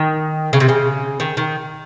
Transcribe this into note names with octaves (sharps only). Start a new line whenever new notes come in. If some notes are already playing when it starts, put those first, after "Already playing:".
Already playing: D#3
C#3
C3
C#3
D#3
D#3